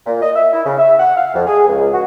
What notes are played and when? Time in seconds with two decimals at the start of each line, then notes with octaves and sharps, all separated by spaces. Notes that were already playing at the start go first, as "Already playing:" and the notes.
0.07 A#2
0.22 D#5
0.35 E5
0.53 E4
0.66 C#3
0.79 E5
1.00 F#5
1.17 F5
1.34 F2
1.47 G#4
1.68 C#2
1.93 F#4